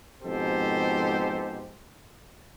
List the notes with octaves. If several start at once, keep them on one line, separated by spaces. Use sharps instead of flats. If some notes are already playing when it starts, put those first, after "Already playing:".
F2 G#2 B2 G4 A4 C5